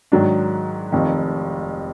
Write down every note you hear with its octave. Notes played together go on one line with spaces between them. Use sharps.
G#2 D#3 F#3 D4
F1 F2 D#3